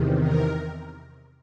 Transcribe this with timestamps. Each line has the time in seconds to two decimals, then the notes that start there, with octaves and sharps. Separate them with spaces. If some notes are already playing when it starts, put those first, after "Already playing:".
Already playing: E2 C3 D#3
0.21 A#4